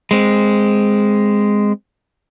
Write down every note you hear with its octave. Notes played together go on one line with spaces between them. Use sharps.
G#3 C4